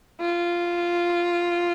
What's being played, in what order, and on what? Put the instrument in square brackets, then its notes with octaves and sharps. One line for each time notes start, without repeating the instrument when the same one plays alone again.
[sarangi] F4